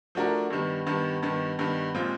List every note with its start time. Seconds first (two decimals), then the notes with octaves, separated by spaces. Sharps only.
0.15 F3 A3 D4 F#4 A#4
0.50 G2 D#3 G3 B3
0.87 G2 D#3 G3 B3
1.23 G2 D#3 G3 B3
1.59 G2 D#3 G3 B3
1.94 A#2 F3 G#3 C4 F4